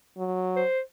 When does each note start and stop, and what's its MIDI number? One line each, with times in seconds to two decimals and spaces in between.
0.17 0.62 54
0.56 0.80 72